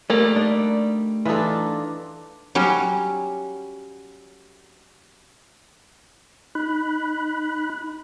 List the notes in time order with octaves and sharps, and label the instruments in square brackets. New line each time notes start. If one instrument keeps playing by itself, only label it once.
[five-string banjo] G3 A#3 [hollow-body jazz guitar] A3
[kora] D4 D#4 D5
[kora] E3 D#4 A4 [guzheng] D4 F4
[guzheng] F#3 G3 C#4
[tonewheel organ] D#4 B5 F#6